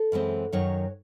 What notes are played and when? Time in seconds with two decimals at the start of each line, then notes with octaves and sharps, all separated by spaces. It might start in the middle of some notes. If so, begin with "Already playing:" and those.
Already playing: A4
0.12 F#2 E3 G#3 C4
0.53 F#2 D#3 F#3 C#5